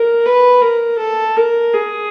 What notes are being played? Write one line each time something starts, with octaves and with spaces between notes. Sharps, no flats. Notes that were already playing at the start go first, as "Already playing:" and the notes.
Already playing: A#4
B4
A#4
A4
A#4
G#4